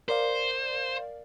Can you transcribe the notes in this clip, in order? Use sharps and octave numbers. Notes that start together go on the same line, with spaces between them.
A#4 C5 D5 F5